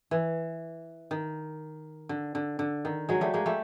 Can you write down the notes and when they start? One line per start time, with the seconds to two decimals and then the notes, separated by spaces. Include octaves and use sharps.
0.11 E3
1.11 D#3
2.09 D3
2.35 D3
2.59 D3
2.85 D#3
3.09 F#3 G#3
3.21 G3 A3
3.34 G#3 A#3
3.46 G3 A3